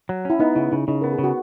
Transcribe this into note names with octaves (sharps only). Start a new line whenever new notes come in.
F#3
C#4 E4
B3 D#4
C#3 E4
C#3 D#4
C#3 D#4
B3 A#4
G#4
C#3
F#4